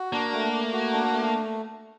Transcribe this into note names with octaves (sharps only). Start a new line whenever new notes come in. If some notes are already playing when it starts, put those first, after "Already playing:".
Already playing: F#4
A#3 D4
A3
A3
F#4
D4
A3